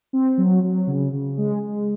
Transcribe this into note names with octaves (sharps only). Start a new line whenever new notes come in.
C4
F#3
F#3
C#3
C#3
G#3
G#3